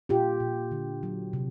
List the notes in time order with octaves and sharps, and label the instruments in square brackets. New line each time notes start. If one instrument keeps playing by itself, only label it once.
[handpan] A#2 F4 G4
A#2
D3
F#3
C3